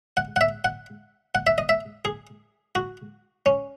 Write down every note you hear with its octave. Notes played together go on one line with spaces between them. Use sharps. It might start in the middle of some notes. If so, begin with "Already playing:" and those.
F#5
F#5
E5
F#5
F#5
E5
D#5
E5
G#4
F#4
C#4